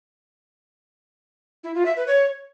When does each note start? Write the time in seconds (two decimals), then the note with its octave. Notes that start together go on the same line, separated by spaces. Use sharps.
1.64 E4
1.75 F4
1.86 E5
1.96 B4
2.07 C#5